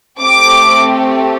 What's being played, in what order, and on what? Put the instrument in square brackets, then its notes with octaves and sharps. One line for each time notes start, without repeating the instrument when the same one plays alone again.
[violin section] A3 C4 G4 D6